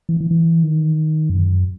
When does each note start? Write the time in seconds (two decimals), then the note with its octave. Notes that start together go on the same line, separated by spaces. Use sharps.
0.09 E3
0.20 E3
0.31 E3
0.63 D#3
1.30 F#2